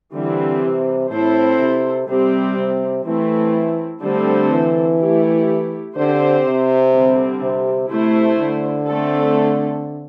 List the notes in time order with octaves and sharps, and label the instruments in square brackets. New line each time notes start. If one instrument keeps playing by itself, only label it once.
[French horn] D3 [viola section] E3 G3 C4
[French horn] C3
[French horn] A2 [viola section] C4 E4 A4 C5
[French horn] C3
[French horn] C3 [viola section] G3 C4 G4
[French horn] C3
[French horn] E3 [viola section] A3 C4 E4
[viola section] D3 A3 C4 A4 C5 [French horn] G3
[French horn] E3
[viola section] A3 E4 G4
[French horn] D3 [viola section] C4 G4 C5
[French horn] C3
[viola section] D3 G3 C4
[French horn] C3
[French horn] C3 [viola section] A3 E4 C5
[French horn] D3
[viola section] A3 C4 A4